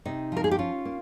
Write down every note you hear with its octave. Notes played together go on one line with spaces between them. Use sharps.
C3 D#4
F3 A#4
G#4
G4
C#4 F4
A#3